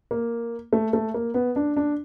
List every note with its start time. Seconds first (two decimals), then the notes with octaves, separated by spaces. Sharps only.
0.11 A#3
0.73 A3
0.93 A3
1.14 A#3
1.34 B3
1.56 D4
1.77 D4